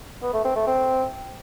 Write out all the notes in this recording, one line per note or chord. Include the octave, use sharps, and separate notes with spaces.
B3
A3
C4
A3
C4